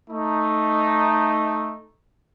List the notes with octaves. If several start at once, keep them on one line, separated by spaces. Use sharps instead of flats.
A3 D#4